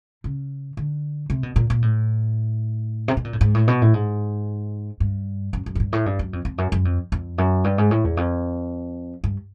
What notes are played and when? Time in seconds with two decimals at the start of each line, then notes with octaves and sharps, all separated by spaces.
0.24 C#3
0.77 D3
1.30 C3
1.43 B2
1.56 A#2
1.70 A#2
1.82 A2
3.08 C3
3.17 B2
3.24 A#2
3.33 A2
3.41 G#2
3.55 A2
3.68 B2
3.82 A2
3.94 G#2
5.00 G2
5.53 F#2
5.66 F#2
5.75 G#2
5.80 G2
5.93 A2
6.06 G2
6.19 F#2
6.33 F2
6.45 F2
6.58 F#2
6.72 F#2
6.85 F2
7.12 F2
7.38 F#2
7.64 G2
7.78 G#2
7.91 A2
8.04 E2
8.17 F2
9.24 G2